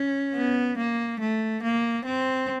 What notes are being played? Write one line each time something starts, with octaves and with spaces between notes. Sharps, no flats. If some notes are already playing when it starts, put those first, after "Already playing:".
Already playing: C#4
B3
A#3
A3
A#3
C4